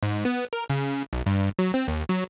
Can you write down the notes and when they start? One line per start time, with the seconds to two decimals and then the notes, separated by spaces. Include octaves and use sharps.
0.03 G#2
0.25 B3
0.53 A#4
0.70 C#3
1.13 B1
1.26 G2
1.59 F#3
1.74 C4
1.88 D#2
2.09 F#3